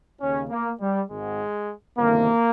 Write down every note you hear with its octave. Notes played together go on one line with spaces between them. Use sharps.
D#2 C#3 C#4
A#3
G3
G#1 G#2 D#3 G#3
G1 F2 C3 D#3 A#3